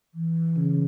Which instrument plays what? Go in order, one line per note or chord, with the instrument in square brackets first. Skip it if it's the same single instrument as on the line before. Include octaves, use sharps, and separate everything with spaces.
[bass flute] E3
[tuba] C#3